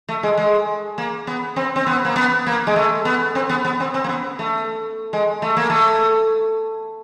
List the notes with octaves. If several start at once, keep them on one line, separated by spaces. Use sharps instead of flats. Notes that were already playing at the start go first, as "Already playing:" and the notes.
A3
G#3
G#3
A#3
B3
C4
C4
B3
A#3
B3
A#3
G#3
A3
B3
C4
B3
B3
C4
C4
A#3
B3
A3
G#3
A3
A#3
A3